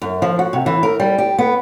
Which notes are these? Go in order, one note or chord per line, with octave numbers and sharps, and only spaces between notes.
F#2
F3
F#4
C3
E3
A#4
G3
G4
B3